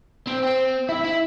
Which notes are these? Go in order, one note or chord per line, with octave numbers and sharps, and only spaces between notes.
C4
C4
E4
E4